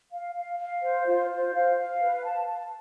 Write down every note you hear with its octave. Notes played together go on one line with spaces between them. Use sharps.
F5
F5
F5
C5
F4
C5
F5
F5
B4
A5
A5